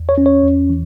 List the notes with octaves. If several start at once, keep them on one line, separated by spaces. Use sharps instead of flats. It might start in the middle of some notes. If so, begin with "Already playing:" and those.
Already playing: E2
C#5
C#4
C#5
E2
E3